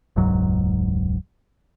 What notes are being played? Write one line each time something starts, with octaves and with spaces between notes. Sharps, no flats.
E1 C#2 G#2 F#3